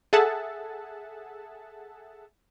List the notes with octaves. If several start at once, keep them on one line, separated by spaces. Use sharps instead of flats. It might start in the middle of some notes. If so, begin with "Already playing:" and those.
G#4 A4 E5 F#5 A5